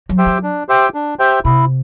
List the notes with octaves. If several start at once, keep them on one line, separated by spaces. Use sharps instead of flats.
F#3
G4 C5 E5 G5
F#3
D4
G4 C5 E5 G5
D4
G4 C5 E5 G5
C3 E4